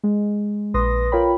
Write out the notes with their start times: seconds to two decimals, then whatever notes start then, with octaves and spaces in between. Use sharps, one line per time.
0.04 G#3
0.74 A#1 B4 C6 D#6 A#6
1.12 F4 A#4 C#5 G5 B5